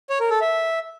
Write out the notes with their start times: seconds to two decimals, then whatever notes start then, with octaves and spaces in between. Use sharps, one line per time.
0.10 C#5
0.20 A#4
0.31 A4
0.41 E5